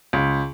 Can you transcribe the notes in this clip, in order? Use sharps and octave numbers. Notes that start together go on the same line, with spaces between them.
C#2